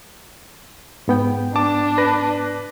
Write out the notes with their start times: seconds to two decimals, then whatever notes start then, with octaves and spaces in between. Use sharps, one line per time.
1.08 G#2 B3 G5
1.56 D4 A5 D6
1.98 B4 A#6